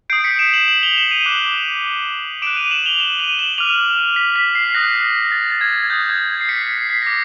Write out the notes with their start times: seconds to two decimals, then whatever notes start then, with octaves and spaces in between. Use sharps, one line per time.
0.10 D#6 G6 C7 D7
0.24 B6 C#7
0.39 D7 E7
0.53 E7 F#7
0.68 E7 F#7
0.83 F7 G7
0.97 E7 F#7
1.11 D#7 F7
1.26 D6 F#6
2.42 D6 F#6 D7 E7
2.57 D#7 F7
2.71 E7 F#7
2.86 F7 G7
3.00 E7 F#7
3.19 D#7 F7
3.39 E7 F#7
3.58 D6 F6 D#7 F7
4.16 B6
4.36 B6
4.55 C7
4.74 D#6 F#6 A#6
5.32 A6
5.51 A6
5.61 G#6
5.90 D#6 F#6 G6
6.10 G#6
6.41 C7
6.49 B6 C#7
6.78 C7
6.90 B6
7.02 D6 A#6